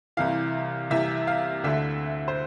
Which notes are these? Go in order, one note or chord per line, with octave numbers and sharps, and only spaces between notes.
C2 C3 E3 F5
C2 C3 E3 E5
F5
D2 D3 E5
C5